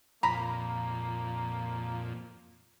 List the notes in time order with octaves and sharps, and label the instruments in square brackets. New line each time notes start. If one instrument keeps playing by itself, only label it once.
[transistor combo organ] F2 A#2 [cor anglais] A#3 [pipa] A#5 B5